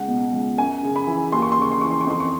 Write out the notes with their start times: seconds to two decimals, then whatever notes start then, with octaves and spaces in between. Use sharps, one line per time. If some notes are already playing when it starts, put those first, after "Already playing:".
Already playing: C#2 F#5
0.08 B2
0.33 C#2
0.58 F#2 G#5
0.83 C#3
0.96 B5
1.07 E3
1.32 D#2 C6
1.42 C#6
1.52 C6
1.57 C#3 C#6
1.72 C6
1.81 E3 C#6
1.91 C6
2.01 C#6
2.07 F2 C6
2.20 C#6